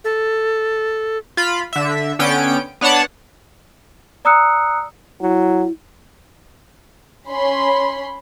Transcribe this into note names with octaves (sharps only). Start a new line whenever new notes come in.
A4
F4 B5
D3 E5
D3 B3 C#4 G5 D7
B3 D4 C#5 F#5 A5
D5 A#5 D#6 E6 F#6 C#7
F#3 E4
C#4 B5 C6